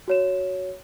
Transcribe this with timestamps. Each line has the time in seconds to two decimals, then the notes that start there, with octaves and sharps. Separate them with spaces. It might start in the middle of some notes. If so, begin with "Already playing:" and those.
0.08 F#4 C#5 E7